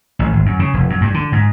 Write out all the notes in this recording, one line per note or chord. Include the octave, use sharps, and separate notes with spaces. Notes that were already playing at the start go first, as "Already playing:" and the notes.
A1
G#1
F#2
C#3
F1
F#2
G2
D3
G#2